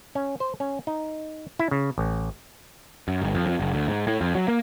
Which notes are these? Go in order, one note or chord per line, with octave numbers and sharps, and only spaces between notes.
C#4
C5
C#4
D#4
E4
C#3
A1
F#2
G1
F2
F2
F#1
D2
G#2
A2
F2
F#3
A#3